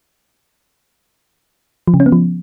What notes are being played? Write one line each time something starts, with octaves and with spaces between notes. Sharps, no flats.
F3
C#3
C#4
B3
F3